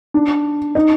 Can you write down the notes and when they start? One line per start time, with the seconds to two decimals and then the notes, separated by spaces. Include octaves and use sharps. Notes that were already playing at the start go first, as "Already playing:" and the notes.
0.14 D4
0.75 D#4